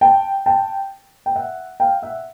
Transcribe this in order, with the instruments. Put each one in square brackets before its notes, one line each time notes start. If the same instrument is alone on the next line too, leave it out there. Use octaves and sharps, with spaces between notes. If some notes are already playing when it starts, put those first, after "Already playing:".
[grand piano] G5 A5
G5 A5
G5
E5 F#5
F5 G5
E5 F#5